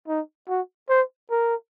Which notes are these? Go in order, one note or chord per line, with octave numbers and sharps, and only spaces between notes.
D#4
F#4
C5
A#4